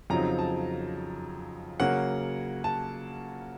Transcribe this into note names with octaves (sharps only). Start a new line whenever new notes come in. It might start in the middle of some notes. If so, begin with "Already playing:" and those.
F2 C#3 F#3 C4 D#4 A#5
A5
C#3 F#3 A#3 C#4 F#5
A5